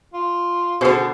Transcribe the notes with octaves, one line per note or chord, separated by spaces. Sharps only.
F4
B2 D3 F#4 G#4 C5 C7